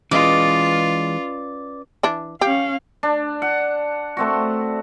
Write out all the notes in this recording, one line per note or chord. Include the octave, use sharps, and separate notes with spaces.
E3 G#3 C#4 F4 G#4 B4 D5 D#5
E3 D4
C#4 G4 F5
D4
F#5
A3 C4 F#4